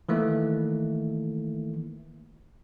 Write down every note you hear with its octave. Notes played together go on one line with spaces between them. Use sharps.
D#3 E3 A3 A#3